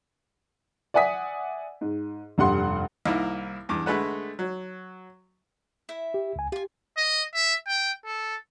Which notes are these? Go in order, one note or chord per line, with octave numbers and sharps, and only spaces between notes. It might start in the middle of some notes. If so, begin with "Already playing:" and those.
D5 E5 F#5 G#5 D#6 B6
G#2
F1 G2 G4 F#5 C6
C2 D#3 A#3 E4
E2 G2 D6
D3 G#3 A3 B4 F#5
F#3
E4 E5
G4
C#2 G#5
F4 G4 G#5
D#5
E5
G5
A4